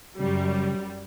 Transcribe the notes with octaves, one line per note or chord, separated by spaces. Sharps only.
F#2 C#3 G3